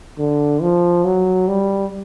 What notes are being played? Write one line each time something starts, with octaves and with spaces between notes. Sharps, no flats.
D3
F3
F#3
G3